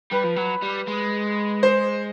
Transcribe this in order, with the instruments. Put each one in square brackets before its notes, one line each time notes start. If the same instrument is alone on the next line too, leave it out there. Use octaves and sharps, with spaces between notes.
[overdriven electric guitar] G3 [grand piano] B4
[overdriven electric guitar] F3
F#3
G3
G#3
[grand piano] C5